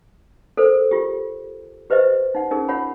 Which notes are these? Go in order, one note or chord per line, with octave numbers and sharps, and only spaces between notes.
A4 A#4 C5
F4 G4
G4 B4 C5 D#5 E5
D#4 F#5
C#4 D#4 G#4 A#4
F4 C#5 F#5 B5